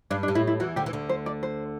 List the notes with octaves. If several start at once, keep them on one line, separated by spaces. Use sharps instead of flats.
G2 D4
D4
G2
A2 E4
E4
E2 E3 F#4
D2 D3 G4
E3
D2 D3
C5
D5
C5